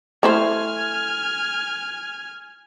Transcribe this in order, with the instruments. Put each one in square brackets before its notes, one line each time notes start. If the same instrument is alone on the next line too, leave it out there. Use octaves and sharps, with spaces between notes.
[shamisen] A3 E4 C5 [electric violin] G#5 F6